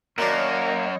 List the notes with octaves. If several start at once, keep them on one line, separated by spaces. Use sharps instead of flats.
F#2 D#3 F#3 A#3 D4 C#5 D#5